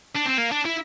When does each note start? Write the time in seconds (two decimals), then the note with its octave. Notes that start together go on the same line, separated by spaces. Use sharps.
0.15 D4
0.25 C4
0.37 A#3
0.51 D4
0.65 E4